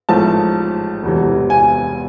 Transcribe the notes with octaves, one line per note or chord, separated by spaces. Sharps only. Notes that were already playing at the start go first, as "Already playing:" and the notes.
A1 G#2 F3 A3 A5
E1 D2 C3 E3
G#5